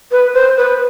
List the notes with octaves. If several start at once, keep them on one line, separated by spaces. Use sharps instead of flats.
B4
C5
B4